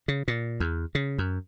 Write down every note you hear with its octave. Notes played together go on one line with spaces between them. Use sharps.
C#3
A#2
E2
C#3
F#2